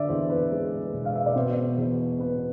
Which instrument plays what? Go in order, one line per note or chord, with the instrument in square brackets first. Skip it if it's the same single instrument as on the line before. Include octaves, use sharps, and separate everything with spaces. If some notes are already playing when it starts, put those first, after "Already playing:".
Already playing: [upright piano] D3 D5 E5
E2 C5
B4
G#3
E1
F5
E5
D5
B2 C5
E2
B3 B4